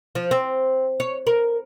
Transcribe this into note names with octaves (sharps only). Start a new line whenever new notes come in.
F3
C4
C#5
A#4